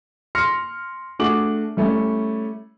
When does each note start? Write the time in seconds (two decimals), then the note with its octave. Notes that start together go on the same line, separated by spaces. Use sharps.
0.35 C6 F6 A#6 C#7
1.19 A3 D4 F#4 G#4 D6 F#7
1.77 G3 A3 C#4 E4